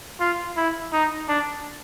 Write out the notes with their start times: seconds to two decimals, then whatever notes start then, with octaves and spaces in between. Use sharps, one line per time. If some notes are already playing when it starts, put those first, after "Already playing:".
0.20 F4
0.57 E4
0.93 D#4
1.29 D4